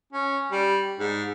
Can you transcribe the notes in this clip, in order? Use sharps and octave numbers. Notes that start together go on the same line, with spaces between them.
C#4
G3
G#2